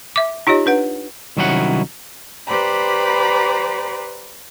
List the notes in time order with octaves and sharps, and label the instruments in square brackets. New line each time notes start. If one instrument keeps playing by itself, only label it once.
[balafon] E5 D6
D#4 F4 G4 C#5 D#5
D4 B4 F#5
[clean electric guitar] C2 D#3 F#3 C#4 E4 F#5
[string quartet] G4 B4 C5 D5 A#5 B5